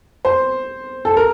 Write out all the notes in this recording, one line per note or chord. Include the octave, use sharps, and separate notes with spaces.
C5
A4
A#4